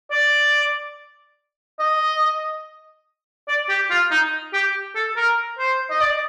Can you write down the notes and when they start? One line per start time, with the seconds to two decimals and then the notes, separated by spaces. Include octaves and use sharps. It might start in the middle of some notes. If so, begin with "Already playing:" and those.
0.11 D5
1.80 D#5
3.49 D5
3.69 G4
3.91 F4
4.11 D#4
4.53 G4
4.96 A4
5.17 A#4
5.59 C5
5.91 D#5
6.01 D5